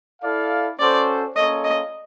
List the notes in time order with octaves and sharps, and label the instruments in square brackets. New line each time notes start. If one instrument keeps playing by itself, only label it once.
[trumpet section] E4 A4 D5 F5
[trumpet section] C#4 F#4 A4 C5 [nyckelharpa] D5
[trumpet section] A#3 C#4 F4 A4 C#5 [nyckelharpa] D#5
[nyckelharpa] D#5